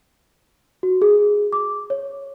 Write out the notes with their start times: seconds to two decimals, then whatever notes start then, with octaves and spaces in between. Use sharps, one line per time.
0.83 F#4
1.02 G#4
1.53 D6
1.90 C#5